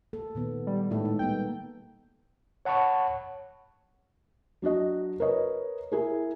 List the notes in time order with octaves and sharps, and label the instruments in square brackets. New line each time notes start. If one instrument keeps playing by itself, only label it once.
[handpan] A3 A#3 A4
A#2 D#3 B3
[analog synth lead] G3
[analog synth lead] A2 [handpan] G#3 D#4 A4
[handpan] D#4
[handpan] G3 A#3 B3 [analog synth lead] G5
[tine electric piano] C#5 F#5 A5 B5 C#6
[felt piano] F#3 D4 F#4 D#5
A#4 B4 C#5 D#5
E4 G#4 A#4